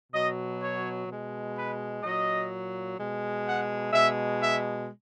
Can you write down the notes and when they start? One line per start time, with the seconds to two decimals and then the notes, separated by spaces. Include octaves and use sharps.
0.12 B2 F#3 D#5
0.59 C#5
1.07 B2 G#3
1.55 B4
2.02 A#2 F#3 D#5
2.98 B2 G#3
3.45 F#5
3.92 B2 G#3 E5
4.40 E5